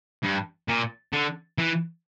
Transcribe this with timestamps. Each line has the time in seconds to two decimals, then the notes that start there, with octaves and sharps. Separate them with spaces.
0.23 G2
0.68 A#2
1.13 D3
1.58 E3